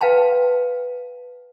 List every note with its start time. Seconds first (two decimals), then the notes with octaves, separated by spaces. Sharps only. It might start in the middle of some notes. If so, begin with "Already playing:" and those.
0.01 B4 F5 G5 A5 C6